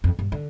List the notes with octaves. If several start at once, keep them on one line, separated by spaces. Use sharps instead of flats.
F2
G2
D3